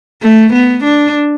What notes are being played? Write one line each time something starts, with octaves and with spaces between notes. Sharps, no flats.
A3
B3
D4